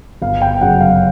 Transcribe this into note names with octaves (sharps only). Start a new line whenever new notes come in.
G1 F5
G5
F#2 C#3 F#5
F5